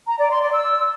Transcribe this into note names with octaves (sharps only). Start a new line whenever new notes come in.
A#5
D5
C6
D5
E6